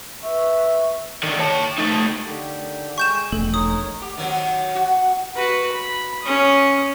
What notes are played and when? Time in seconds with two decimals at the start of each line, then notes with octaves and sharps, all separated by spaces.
0.23 B4 E5 C#6 E6
1.23 D3 D#3
1.39 C#5 A5
1.79 A3 D#4
2.25 D3 D#3 G4
2.98 G#3 G5 G#5 C#6 G6 E7
3.32 E1 A#1 A3 A4
3.54 D#4 A#4 C#5 D#6
4.01 G4
4.17 D#3 F#3 C4
4.75 F#4
5.35 F#4 B4
5.72 B5
6.22 C#4 D#6